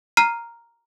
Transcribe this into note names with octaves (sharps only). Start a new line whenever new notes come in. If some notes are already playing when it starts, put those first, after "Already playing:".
A#5 F6 C7 D#7